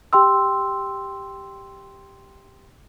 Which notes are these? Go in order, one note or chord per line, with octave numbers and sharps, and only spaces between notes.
G4 G5 C6 E6